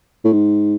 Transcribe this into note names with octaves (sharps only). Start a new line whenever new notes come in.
A2
G#2